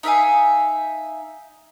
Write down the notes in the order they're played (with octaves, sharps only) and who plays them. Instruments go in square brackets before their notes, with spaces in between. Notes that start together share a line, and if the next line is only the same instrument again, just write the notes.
[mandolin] D#4 E5 F5 G#5